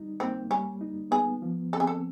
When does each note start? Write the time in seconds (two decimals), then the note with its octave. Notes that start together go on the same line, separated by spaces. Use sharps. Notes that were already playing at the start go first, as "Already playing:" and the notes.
Already playing: G3 D#4
0.20 A#3 C4
0.50 G3 C#4
0.81 D#4
1.11 B3 G#4
1.42 F3
1.73 C4 A4
1.80 G#4
1.87 A4